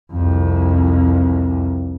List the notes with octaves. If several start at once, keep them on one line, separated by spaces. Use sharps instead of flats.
C2 F2